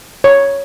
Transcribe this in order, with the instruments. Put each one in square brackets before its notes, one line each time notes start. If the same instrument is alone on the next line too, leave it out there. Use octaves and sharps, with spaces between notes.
[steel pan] C#5